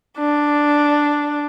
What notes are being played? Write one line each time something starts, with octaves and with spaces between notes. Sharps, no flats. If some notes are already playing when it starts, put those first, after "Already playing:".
D4